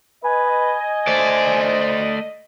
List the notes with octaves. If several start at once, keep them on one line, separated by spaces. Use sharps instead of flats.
B4 D#5 G#5
A3 C5 D5